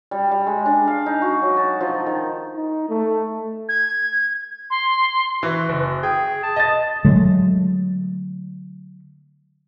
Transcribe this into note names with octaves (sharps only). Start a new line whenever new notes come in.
G3
G3
G#3
D4
F5
D#4
F#4
F#3
A5
F3
D#3
D#4
A3
G#6
C6
E3 F#4
F#1
G#4 G5
A5
D#5 A6
D3 F#3 G#3 A3